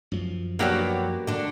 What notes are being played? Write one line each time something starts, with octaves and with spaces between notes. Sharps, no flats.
F#2 F3
F#3 A#3 B3 D4 F#4 G4
D3 D4